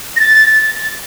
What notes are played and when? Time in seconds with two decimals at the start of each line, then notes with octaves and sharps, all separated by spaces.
0.16 A#6
0.20 A6